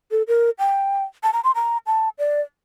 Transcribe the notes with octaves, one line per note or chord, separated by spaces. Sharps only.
A4
A#4
G5
A5
A#5
C6
A#5
A5
D5